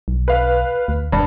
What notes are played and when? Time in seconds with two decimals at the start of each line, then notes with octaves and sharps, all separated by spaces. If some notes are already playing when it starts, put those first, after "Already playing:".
0.08 B1
0.28 B4 F5
0.88 D2
1.12 E1 G2